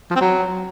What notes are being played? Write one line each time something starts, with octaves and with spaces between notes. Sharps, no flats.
F3
C4
F#3